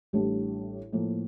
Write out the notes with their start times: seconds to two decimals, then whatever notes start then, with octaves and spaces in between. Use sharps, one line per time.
0.13 A1 A2 G3 D4 G4
0.92 A2 F3 A#3